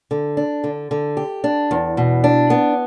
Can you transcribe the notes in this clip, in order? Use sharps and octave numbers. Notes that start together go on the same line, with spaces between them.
D3
D4
D3
D3
G4
D4
E2
B2
D4
B3